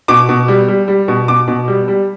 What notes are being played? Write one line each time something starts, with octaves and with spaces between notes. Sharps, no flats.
B2 D6
B2
G3
G3
G3
B2
B2 D6
B2
G3
G3